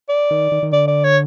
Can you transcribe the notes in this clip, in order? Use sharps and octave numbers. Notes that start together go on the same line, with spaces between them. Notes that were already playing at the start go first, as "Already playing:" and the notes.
D5
D#3
D#3
D#3
D3 D5
D5
C#5